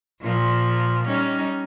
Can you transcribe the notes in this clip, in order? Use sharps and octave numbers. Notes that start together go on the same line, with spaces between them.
A#2 F3
G3 C#4 D#4